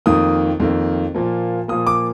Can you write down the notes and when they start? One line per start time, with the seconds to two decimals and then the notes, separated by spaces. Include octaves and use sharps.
0.06 F2 D#3 A#3 D#6
0.60 F2 D#3 A#3
1.14 A#2 F3 A#3
1.68 A#2 F3 A#3 D#6
1.87 D6